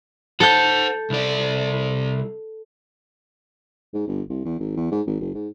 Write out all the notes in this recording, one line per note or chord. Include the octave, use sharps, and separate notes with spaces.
A4 C5 F#5 G6
C2 D5
G#2
G1
C2
E2
G#1
E2
G#2
G#1
F#1
G#2